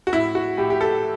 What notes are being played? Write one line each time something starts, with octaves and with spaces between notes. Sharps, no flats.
F#4
A2 E4
F#4
A2 G4
G4
A4